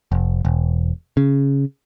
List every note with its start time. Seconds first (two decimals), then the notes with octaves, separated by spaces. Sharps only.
0.12 F1
0.45 E1
1.17 C#3